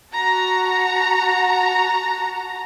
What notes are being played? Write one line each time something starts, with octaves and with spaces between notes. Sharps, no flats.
F#4 A5 A#5